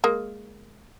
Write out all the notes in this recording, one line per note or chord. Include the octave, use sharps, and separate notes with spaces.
G#3 A#3